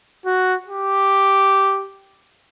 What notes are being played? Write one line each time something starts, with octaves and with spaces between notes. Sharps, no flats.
F#4
G4